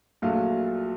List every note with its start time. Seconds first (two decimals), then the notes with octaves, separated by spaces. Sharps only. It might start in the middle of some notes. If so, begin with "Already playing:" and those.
0.22 A#1 A#2 F#3 A3 F5